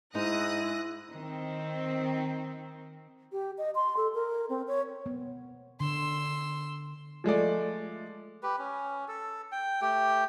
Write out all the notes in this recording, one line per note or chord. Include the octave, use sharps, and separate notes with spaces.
G#2 G#3 D#4 E4 D#6 F#6 A#6
D#3 C4
G4
D#5
C6
A4
A#4
C4
C#5
B3
D3 C6 E6
F3 G#3 A3 D5
G4 B4
C#4
A4
G5
A3 G4 G5